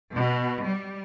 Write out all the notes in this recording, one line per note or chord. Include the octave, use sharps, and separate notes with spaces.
B2
G3